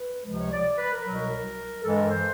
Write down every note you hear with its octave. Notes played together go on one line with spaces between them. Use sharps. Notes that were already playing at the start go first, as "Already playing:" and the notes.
Already playing: B4
C#2 C3 F3 G#3
C#5
D5
B4
A#4
C2 B2 F#3
G2 E3 G#3 A4
A#4
C5